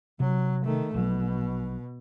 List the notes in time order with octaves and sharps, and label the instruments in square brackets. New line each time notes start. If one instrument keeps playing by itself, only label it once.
[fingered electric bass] C3 [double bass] F#3
[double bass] D#3 A3
[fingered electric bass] A#1 F#3 [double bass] B2